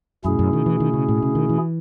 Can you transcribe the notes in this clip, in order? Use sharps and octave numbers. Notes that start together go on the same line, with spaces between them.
F#2 B2 A3 C#4 E4 G#4
F#2
D#3
E3
D#3
C#3
A2
C#3
D#3
E3